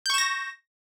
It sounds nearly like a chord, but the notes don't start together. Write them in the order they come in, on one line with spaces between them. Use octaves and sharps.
G6 C#6 E7 A#6